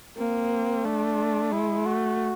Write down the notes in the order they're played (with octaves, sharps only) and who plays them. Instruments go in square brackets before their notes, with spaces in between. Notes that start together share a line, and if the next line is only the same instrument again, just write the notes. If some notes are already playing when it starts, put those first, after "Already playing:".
[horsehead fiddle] A#3 [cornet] C4
[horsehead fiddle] A3 [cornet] D4
[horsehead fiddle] G#3 [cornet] E4
[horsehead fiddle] A3 [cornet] F#4